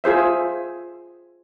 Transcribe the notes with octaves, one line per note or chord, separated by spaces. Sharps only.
F4 G#4 C5 E5